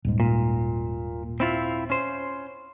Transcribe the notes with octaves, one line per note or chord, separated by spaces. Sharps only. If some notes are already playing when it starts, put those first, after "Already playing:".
D#1 G#2
A#2
C4 E4 F4
C#4 C5